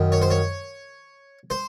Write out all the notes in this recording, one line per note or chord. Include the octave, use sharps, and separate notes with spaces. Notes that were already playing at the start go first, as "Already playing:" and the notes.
Already playing: F#2 D#3
C#5
C5
C#5
C5